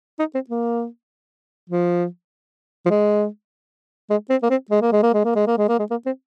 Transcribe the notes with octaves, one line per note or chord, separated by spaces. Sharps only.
D#4
C4
A#3
F3
F3
G#3
G#3
C4
A#3
C4
G#3
A#3
G#3
A#3
G#3
A#3
G#3
A#3
G#3
A#3
G#3
A#3
C4